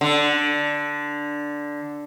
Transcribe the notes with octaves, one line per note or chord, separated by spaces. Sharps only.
D3